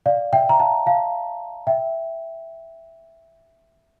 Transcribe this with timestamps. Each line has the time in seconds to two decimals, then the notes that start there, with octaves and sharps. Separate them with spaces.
0.06 D5 F5
0.33 E5 G5
0.49 A#5
0.60 F5 A5
0.86 F5 A5
1.67 E5 G5